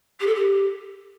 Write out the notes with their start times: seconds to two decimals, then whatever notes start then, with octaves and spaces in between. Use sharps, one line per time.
0.20 G4
0.26 A4
0.35 G4